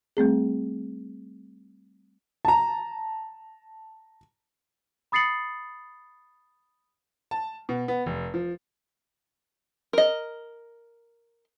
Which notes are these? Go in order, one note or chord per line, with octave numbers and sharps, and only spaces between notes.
G3 A3 C4 G#4
A5 A#5
B5 D#6 A6 C7 C#7 F#7
A5
B2
B3
F1
F3
A#4 D#5